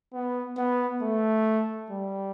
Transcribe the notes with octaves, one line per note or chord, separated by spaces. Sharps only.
B3
B3
A3
G3